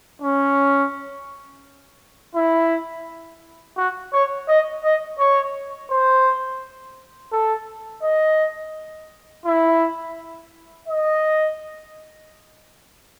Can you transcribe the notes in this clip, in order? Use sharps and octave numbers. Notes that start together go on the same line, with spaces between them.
C#4
E4
F#4
C#5
D#5
D#5
C#5
C5
A4
D#5
E4
D#5